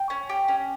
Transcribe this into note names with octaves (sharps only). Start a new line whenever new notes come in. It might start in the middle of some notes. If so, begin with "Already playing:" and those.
Already playing: G5
C#4
G4
C#4